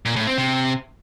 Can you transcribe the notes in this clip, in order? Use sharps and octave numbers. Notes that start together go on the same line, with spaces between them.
A#2
A2
C4
C3